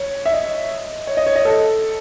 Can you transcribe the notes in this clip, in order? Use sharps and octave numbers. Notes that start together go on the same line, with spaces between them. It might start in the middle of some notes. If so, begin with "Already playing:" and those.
Already playing: C#5
E5
D#5
C#5
D#5
C#5
D#5
A4